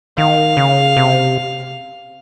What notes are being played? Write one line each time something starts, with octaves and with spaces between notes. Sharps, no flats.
D#3 F5
C#3
C3